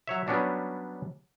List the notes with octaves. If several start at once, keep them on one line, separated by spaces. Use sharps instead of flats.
F#3 C#5 E5
F#3 G3 B3 C#4 D4 F#4